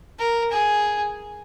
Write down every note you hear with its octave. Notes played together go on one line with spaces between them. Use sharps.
A#4
G#4